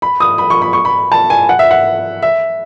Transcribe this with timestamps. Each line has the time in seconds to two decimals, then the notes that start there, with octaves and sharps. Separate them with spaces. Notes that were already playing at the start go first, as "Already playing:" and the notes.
0.02 B5
0.20 D#6
0.38 B5
0.50 C#6
0.62 B5
0.73 C#6
0.85 B5
1.12 A5
1.30 G#5
1.49 F#5
1.59 E5
1.71 F#5
2.23 E5